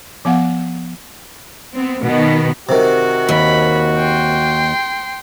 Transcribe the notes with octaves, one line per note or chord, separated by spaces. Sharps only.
F3 B3 F5 F#5
B3 C4
B2 D#3 B3
C3 D#3 F#4
D#2 B5
G5 C6